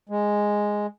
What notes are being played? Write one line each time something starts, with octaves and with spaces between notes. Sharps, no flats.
G#3